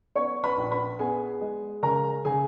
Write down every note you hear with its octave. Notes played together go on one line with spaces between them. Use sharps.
B3 C#5 C#6
B4 B5
A#1
B4 B5
B3 G#4 G#5
G#3
C#3 A#4 A#5
C#3 G#4 G#5